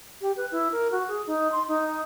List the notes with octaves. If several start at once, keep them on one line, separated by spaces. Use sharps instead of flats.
G4
B4
E4
A#4
F#4
G#4
D#4
C6
D#4